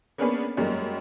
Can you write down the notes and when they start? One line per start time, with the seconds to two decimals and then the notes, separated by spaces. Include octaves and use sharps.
0.18 A#3 B3 C#4 D4 G#4 B4
0.57 F#2 G3 G#3 A#3